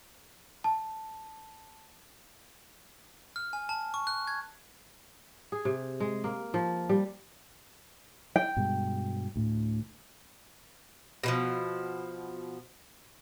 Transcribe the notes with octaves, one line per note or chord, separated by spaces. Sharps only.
A5
F6
G#5
A5
C#6
F#6
G#6
G#4
C3
G#3
A#3
F3
G3
G5
G2 B2 G#3
D2 A2
B2 E3 F3